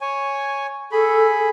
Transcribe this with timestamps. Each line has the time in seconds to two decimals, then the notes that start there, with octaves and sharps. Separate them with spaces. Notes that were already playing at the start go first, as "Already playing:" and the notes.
0.01 C#5 G#5
0.92 G#4 A4 B5